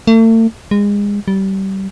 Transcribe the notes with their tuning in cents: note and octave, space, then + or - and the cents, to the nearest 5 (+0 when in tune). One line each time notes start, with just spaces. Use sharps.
A3 +40
G#3 -30
G3 -25